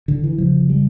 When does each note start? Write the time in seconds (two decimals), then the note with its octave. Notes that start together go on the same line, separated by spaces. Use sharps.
0.08 D3
0.24 E3
0.38 F1 F2 C#3 F3
0.70 G3